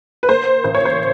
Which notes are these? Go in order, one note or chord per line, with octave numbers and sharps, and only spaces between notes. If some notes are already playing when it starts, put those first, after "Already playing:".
B4
A#3 C5
A1 C5
C#5
C5